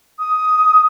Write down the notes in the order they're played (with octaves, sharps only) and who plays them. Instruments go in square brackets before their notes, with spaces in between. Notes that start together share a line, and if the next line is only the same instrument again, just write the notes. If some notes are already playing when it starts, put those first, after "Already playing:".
[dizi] D#6